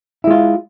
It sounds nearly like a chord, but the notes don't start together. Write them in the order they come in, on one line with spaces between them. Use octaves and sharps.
E4 G#3 F4